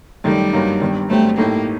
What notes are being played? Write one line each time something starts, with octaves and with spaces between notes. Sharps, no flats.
F#2 D#3 G3 A3 D#4
G2 F#3 A#3 D#4
G1 G2 D#3
G1 G2 F#3 A3 C4 G4
A2 A3 A#3 D#4 G4